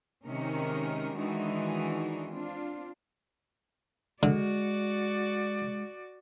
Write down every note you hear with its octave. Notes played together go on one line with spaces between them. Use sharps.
C3 D#3 G#3 C#4 D#4 A#4
D#3 E3 G#3 D4 D#4 F#4
C4 D4 F4
D3 G#3 F#4 D5